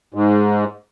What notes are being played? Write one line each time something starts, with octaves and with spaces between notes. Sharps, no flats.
G#2